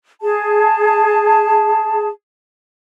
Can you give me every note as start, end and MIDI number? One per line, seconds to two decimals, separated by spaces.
0.21 2.08 68
0.21 2.08 81